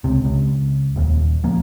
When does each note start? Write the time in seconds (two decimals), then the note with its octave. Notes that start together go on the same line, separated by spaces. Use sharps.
0.04 C#2 C3
0.25 C#2
0.96 D#1 D#2
1.43 D2 F3 A#3